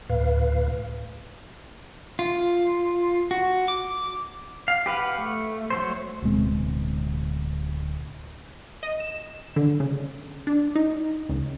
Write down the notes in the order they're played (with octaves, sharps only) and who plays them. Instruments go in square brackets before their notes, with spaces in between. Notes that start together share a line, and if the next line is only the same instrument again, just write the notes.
[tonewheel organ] D2 A2 B4 F5
[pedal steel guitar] F4
F#4
D6
F5
G4 B4 F5 F#5
A3
F#3 A3 C5
[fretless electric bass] D1 B2 G#3 C4
[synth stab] D#5
E7
D3
C#3
D4
D#4
C#2